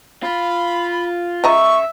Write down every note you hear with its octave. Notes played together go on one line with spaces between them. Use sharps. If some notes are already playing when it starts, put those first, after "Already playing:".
F4 B5
C#3 D#5 E5 A#5 C#6